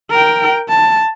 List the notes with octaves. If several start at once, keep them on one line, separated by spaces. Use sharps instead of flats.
A#4 G5
A5